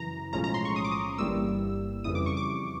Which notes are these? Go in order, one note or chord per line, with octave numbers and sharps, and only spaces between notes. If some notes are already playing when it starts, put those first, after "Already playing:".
Already playing: F#2 C#3 E3 A#5
B1 A2 F3 G#3 C#4 A#5
A#5
C6
C#6
D#6
D6
D#6
G1 G2 E3 G3 A#3 E6
F2 C#3 E3 G3 D#6
D6
C#6
D6